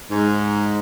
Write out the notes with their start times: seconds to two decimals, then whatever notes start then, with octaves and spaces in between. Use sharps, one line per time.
0.11 G#2